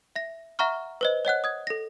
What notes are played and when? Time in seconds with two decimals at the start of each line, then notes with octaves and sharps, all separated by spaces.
0.16 E5 A#6
0.59 E5 F#5 A#5 C#6 F6
1.01 B4 C5 D#5
1.25 C#5 D#5 F#5 F#6
1.44 D#6 G#6
1.67 A4 A#6